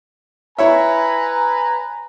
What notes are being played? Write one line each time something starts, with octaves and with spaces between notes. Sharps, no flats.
E4 B4 C#5 E5 G#5 A#5